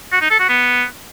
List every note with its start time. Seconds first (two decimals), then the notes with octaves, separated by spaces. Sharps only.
0.12 F#4
0.21 D#4
0.31 A4
0.40 F#4
0.49 B3